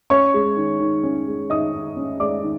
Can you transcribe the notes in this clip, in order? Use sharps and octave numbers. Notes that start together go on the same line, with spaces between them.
C#4 C#5 C#6
G#3
D#3
D#3
C#4
G#3
D#3 D#5 D#6
D#3
C#4
G#3 D5 D6
D#3